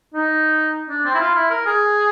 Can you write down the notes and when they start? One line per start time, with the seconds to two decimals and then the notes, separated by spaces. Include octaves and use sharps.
0.14 D#4
0.89 D4
1.05 C4
1.14 E4
1.20 F4
1.35 E4
1.50 A#4
1.66 G#4